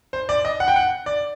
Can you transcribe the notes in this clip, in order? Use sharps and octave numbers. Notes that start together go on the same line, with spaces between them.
C5
D5
D#5
F#5
G5
F#5
D5